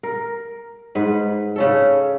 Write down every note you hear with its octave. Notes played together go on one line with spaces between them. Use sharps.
A#4
G#2 B4
C#3 C#4 A4